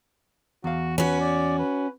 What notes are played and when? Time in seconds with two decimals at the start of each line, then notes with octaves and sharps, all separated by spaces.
0.64 E2 F#4 F5
0.98 C#4 F#4 B4
1.21 D5
1.59 B4